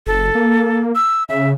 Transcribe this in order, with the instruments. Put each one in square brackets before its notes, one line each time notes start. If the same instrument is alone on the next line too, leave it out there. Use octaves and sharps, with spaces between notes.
[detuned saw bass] F#1 [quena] A4
[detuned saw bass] A#3
[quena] E6
[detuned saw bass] C#3 [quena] E5